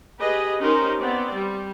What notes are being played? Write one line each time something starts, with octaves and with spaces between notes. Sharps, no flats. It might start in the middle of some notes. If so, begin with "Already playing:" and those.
G4 G#4 B4 D#5
C#4 D#4 G4 A#4 C5
B3 C4 D5
G3